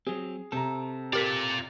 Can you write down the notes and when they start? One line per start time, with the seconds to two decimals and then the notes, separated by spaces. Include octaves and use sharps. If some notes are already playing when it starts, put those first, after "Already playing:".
0.07 F#3 C4 G#4
0.52 C3 C4 A4 A#5
1.13 F4 G4 A#4 D5 B6